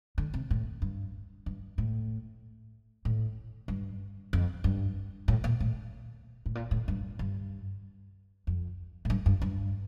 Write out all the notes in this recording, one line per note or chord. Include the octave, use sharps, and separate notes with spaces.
D3
C3
A2
G2
G2
A2
A2
G2
F2
G2
A2
A#2
A2
A2
A#2
A2
G2
G2
F2
A2
G2
G2
G2